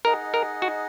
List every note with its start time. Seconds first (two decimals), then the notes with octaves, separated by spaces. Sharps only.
0.05 D#4 G#4 A#4 D#5 F#5
0.34 A#4
0.62 F#4